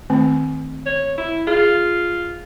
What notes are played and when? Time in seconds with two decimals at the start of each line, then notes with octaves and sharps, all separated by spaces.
0.10 D#3 A3 C4
0.86 C#5
1.18 E4
1.47 F4 G#4